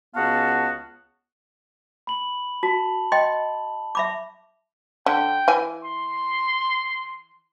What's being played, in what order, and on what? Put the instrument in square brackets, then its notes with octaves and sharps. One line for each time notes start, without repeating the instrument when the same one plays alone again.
[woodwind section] C#2 B3 F#4 F5 A5
[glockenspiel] B5 F#7
[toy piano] F#4 [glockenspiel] A5
[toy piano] D#5 G5 C6
E5 B5 D6
[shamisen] D3 [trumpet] G5
[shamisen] E3 G#5
[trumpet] C6